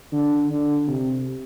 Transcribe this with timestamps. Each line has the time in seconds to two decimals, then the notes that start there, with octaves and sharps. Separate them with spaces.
0.13 D3
0.50 D3
0.87 C3